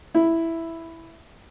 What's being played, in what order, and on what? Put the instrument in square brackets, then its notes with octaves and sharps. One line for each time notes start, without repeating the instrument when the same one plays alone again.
[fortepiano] E4